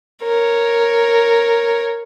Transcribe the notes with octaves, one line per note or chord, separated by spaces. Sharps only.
A#4 C#5